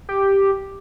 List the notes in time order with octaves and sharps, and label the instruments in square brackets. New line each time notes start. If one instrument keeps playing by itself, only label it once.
[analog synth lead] G4